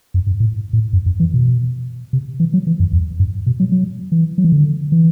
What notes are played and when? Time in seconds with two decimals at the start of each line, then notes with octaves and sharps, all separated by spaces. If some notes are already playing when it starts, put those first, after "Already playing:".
0.14 F#2
0.27 G2
0.40 A2
0.73 A2
0.93 F#2
1.06 F#2
1.20 E3
1.34 B2
2.13 C3
2.40 E3
2.53 F#3
2.67 E3
2.80 F#2
2.93 E2
3.20 G2
3.46 B2
3.60 F#3
3.72 F#3
4.12 E3
4.38 F#3
4.44 E3
4.52 D3
4.92 E3